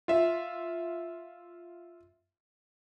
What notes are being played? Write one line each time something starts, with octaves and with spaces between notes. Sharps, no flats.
F4 E5